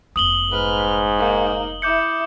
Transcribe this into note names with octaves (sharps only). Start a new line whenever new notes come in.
F1 B3 D#6 F#7 G7
G#2 B4 F6
A#3 D#4
E4 E5 D6 G6 C#7